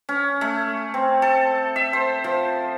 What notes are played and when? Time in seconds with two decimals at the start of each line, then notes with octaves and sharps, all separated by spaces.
0.09 C#4
0.41 A3
0.94 C4
1.22 A4
1.76 E5
1.93 C5
2.24 F3